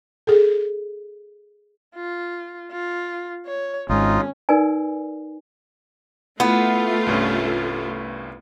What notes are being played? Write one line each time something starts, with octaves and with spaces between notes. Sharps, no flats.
G#4 A4
F4
F4
C#5
G#1 G#2 C#4 D#4 F4
D#4 A#4 B4 D5 G#5
A3 B3 E4 F4 F#5
C2 G2 C#4